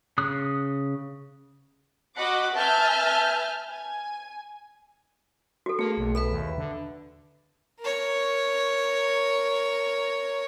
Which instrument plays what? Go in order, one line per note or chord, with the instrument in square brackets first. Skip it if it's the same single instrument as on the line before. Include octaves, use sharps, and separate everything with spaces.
[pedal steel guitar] C#3 D#6 F#6
[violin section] F#4 D#5 F#5 B5 D6
B4 E5 G#5 A5 F6 G6
G#5
[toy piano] F#4 A4
[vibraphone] A3 G#4 [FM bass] A#3 [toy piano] F#4
[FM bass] B1
[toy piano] A4 [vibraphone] B4 E5 B5
[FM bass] D#2
D3
[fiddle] A#4 C#5